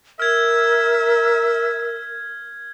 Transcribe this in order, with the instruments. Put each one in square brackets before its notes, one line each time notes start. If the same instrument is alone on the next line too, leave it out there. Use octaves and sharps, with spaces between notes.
[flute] A#4 [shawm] E5 [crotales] F6 G#6